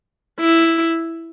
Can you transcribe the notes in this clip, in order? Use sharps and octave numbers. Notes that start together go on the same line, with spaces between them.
E4